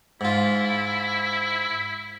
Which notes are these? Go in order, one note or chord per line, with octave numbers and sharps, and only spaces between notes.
G#2 E4 F4